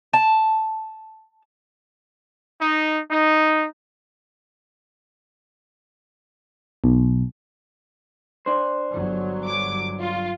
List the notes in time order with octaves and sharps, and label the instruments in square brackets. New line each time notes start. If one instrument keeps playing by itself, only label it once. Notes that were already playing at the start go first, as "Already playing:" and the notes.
[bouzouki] A5
[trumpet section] D#4
D#4
[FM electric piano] B1
[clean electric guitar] D4 C5
[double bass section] G1 F#3
[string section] D6
F4